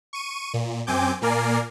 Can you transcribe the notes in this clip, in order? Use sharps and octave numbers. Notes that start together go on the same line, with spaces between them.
C#6 D#7
A#2
F#2 C4 G#5 D6 G6
A#2 A#3 A#4 D5 G#5 C7